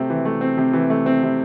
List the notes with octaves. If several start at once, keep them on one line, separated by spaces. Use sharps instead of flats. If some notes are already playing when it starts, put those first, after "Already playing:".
Already playing: C3 A3 C4
E3
A3
C4
C3
E3
A3
C4
C3